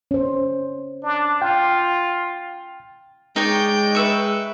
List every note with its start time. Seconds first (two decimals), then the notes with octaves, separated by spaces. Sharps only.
0.11 C#4 C5
1.03 D4
1.42 F4 G5
3.36 G#3 D#4 C#5 D5 G5
3.95 B4 E5 C#6